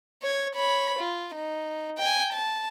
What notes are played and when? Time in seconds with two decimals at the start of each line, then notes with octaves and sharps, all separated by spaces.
0.22 C#5 G#6
0.55 C#5 B5
0.99 F4
1.35 D#4
1.98 G5 G#5
2.33 A5